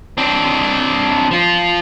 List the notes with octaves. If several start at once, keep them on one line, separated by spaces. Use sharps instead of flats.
C4 D4
F3 F4